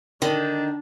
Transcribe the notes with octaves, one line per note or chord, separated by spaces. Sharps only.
D3 D#3 D4